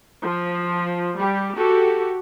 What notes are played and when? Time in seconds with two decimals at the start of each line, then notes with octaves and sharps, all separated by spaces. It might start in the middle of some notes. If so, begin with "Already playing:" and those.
0.22 F3
1.18 G3 G4
1.57 F#4 G4 A4